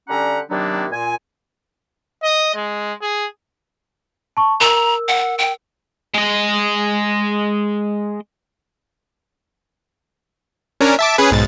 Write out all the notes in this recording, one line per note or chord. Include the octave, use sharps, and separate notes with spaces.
D3 G3 C#4 G4 F#5 A#5
C3 D#3 F#3 A#3 B3 D4
A#2 G#5
D#5
G#3
G#4
A5 C#6
A#4 A#5 E6
F#5
G5
G#3 D#5
C#4 D4 A#4
E5 A5 D6
C#4 G#4 B4
B1 G#2 A6